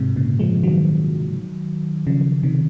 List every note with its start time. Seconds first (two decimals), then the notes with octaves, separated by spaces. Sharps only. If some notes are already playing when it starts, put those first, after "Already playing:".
Already playing: G#2 C3
0.16 A#2 C#3
0.39 F3 G#3
0.63 D#3 F#3
2.07 C#3 F3
2.43 C3 D#3